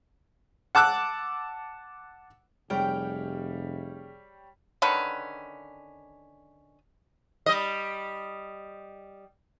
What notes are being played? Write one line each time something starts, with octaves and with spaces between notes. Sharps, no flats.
F#5 A5 D6 E6 F#6
F1 G3 G4 G#4 C#5 G5 F6
D3 D#3 C#4 B4
G3 D#5